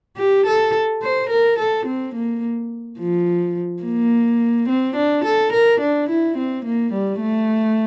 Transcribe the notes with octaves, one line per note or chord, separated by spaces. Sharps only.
G4
A4
C5
A#4
A4
C4
A#3
F3
A#3
C4
D4
A4
A#4
D4
E4
C4
A#3
G3
A3